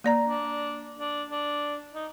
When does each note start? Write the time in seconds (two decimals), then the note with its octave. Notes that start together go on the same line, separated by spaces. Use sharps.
0.04 A#3 D5 A#5
0.24 D4
0.99 D4
1.30 D4
1.94 D#4